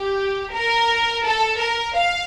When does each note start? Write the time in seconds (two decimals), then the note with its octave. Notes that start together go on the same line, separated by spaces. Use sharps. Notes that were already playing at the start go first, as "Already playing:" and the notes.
Already playing: G4
0.54 A#4
1.25 A4
1.60 A#4
1.96 F5